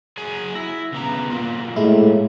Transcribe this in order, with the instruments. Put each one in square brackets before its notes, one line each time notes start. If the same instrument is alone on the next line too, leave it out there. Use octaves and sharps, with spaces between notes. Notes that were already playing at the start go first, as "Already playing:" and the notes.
[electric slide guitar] F#3 G#4 G#5
[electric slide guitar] E4 [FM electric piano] A#6
[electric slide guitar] C#3 B3 A#5
F#3 A#3 F4
[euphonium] A2 [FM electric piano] G#3 A3 E4